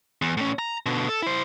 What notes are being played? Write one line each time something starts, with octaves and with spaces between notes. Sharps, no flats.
E2
A2 C#4
A#5
B2 D3
A4
E4 C5